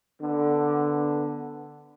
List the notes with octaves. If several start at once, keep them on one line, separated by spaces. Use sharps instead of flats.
D3 B3